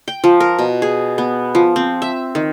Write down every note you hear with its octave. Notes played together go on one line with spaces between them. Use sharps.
G5
F3
A#4
B2
G#4
B3
F3
C4
E5
D#3